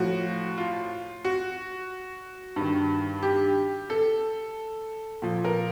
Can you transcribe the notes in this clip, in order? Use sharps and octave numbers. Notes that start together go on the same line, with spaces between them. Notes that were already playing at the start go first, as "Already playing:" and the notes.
Already playing: A2 F3 F#4
F4
F#4
G2 D#3
G4
A4
A#2 F3
A#4